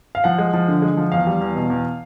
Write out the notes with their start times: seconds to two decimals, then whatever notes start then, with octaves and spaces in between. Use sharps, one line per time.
0.15 F5
0.24 F3 F#5
0.38 G#3
0.54 F3
0.68 D3
0.82 G#3
0.97 F3
1.12 E2 F5
1.27 G3
1.41 E2
1.56 B2
1.70 E2